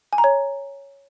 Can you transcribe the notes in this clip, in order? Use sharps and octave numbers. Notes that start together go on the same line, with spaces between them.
G#5
A#5
C#5